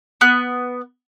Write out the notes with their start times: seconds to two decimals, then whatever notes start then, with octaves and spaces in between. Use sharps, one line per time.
0.21 B3 F#6